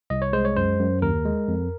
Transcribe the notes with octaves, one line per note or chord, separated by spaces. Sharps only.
C2 D#5
C#5
G#3 C5
C#5
F#2 C5
F#2
D#2 A#4
G#3
F2